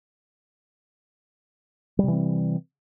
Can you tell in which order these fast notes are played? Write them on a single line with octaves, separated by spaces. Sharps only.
G3 C3 E3 C4